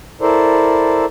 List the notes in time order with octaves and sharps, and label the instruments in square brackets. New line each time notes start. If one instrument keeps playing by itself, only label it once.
[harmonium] E4 A4 A#4 C5 D5